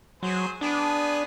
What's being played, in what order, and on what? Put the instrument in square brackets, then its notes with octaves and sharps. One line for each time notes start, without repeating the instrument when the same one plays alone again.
[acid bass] F#3 [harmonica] G#4 C5
[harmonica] B3 G#4 [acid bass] D4